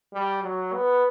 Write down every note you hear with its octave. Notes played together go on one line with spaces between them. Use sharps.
G3
F#3
B3